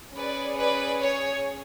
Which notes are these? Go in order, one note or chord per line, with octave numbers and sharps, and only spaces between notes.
C#4 G#4 B4 D5
B4 D5
C#5